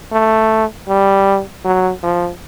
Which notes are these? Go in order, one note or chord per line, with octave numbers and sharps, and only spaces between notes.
A3
G3
F#3
F3